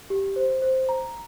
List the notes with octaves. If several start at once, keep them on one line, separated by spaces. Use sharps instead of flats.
G4
C5
C5
A#5